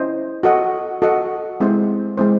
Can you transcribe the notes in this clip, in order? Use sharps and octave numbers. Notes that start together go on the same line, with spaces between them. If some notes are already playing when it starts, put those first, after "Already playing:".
Already playing: C#4 E4 C5 D#5
F#4 A4 D#5 F#5
F#4 A4 D#5 F#5
G#3 C4 E4 C5
G#3 C4 E4 C5